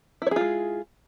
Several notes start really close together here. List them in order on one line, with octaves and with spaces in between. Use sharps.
E4 C#5 G#4 F4 G#3